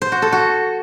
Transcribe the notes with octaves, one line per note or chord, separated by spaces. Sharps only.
C5
F#4
A4
F#4